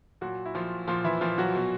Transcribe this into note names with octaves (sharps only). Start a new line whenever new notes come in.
A#2 F#3 F#4
E4
A#2 F3 F4
A#2 F3 F4
E3 E4
A#2 F3 F4
F#3 F#4
B2